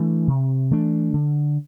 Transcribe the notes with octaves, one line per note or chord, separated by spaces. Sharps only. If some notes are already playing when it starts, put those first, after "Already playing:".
Already playing: E3 A3 D4
C3
E3 A3 D4
D3